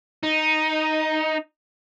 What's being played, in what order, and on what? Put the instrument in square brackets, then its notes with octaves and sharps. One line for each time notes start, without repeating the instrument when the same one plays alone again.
[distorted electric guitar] D#4